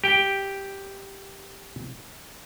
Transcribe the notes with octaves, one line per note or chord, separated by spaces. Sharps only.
G4 G5